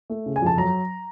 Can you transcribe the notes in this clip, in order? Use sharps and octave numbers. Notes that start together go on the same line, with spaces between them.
A3
C#3
G#5
F2 A5
F#3 A#5